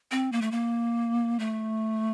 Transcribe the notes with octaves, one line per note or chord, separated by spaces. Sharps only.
C4
A#3
A3
A#3
A3